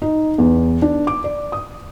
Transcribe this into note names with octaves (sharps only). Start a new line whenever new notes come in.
D#4
E2
D4
D6
D5
D#6